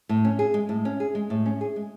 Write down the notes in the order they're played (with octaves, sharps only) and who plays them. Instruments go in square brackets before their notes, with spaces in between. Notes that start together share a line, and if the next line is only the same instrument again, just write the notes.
[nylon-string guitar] A2
C#4
G#4
G#3
A2
C#4
G#4
G#3
A2
C#4
G#4
G#3